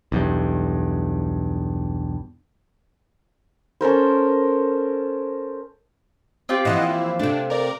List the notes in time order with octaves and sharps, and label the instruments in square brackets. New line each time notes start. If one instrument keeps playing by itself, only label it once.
[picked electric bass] B1 E2 G2
[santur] C#4 A4 A#4 C5
[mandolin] C4 F4 G4
[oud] A#2 E3 F3 [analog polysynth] E4 D#5 F#5
[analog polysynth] E4
[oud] C3 A3 [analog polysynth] D4
[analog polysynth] A#4 D5